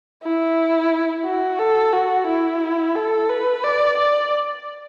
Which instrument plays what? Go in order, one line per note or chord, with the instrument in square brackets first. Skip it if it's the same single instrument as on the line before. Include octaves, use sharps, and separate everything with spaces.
[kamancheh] E4
F#4
A4
F#4
E4
A4
B4
D5
D5